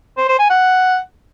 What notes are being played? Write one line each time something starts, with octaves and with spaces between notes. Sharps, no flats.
C5
C5
G#5
F#5